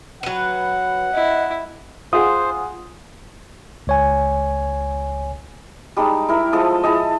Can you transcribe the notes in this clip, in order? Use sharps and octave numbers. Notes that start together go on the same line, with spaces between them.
F#3 B4 F#5
E4 D#5
F4 G#4 C5 F#5 D#6
C#2 C#5 G#5
G3 G#3 D#4 A5
E4 A#4 E5
F3 G#3 A4 D#6
E4 G#4 A4 D#5